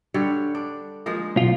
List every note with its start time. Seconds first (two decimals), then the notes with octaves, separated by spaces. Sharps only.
0.14 D3 G3 C#5
0.55 D4
1.06 F3 G#3 A#3
1.37 B1 F4